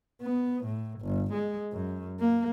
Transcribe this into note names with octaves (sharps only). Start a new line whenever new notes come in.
B3
A2
G1
G#3
F#2
A#3